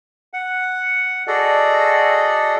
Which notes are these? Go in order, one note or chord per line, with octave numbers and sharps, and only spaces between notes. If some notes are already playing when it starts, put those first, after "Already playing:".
F#5
F#4 G#4 A4 D5 D#5